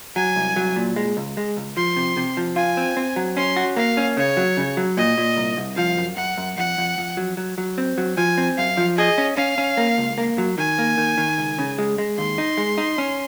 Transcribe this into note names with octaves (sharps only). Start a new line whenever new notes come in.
F#3 G#5
C2
F#3
A#2
G#3
C#2
G#3
C#2
F3 C6
C3
C3
F3
F4 G#5
C4
C4
F#3
C#4 C6
F#4
A#3 F5
C#4
C#3 C#5
F#3
C#3
F#3
A#2 D#5
A#2
C2
C2
F3 F5
F#2
F#2 F#5
F#2
F2 F#5
F2
F2
F#3
F#3
F#3
C4
F#3
F3 G#5
C4
F#2 F5
F3
G#4 D#5
C#4
C#4 F5
C#4
A#3
C#2
A#3
F#3
D#3 G#5
A#3
D#3
D#3
C#2
C#3
G#3
G#3
D#2 C6
D#4
G#3
D#4
C#4